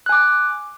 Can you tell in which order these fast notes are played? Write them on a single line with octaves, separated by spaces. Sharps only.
F#6 G#5 D6